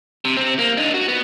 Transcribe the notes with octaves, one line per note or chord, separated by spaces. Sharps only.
C3
C3 C4
A#3
D4 D#4
F#4
B3